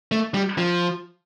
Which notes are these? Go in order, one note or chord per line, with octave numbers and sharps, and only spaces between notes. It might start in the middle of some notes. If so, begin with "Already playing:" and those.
A3
G3
F3